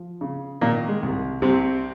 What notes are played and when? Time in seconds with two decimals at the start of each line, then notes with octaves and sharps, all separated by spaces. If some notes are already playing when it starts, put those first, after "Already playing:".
Already playing: F3
0.21 C#3
0.61 A#2 D#3 A#3
0.88 G#3
1.02 C2
1.42 C2 C3 C4